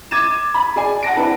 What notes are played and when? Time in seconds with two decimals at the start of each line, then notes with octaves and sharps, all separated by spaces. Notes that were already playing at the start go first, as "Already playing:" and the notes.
0.11 D6 G#6 A6 D#7 E7
0.54 B5
0.76 G#4 D5 G#5
1.03 F#5 A5 A#6 D7
1.17 C4 D4 E4 B4